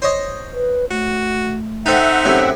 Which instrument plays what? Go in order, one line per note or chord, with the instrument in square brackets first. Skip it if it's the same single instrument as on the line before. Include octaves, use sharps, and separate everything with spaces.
[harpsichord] C5 C#5 D#5
[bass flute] B4
[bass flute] A3 [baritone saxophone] F#4
[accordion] C4 E5 F#5 [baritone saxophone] D#4 [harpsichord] A4 C5
[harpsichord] F#2 A2 C3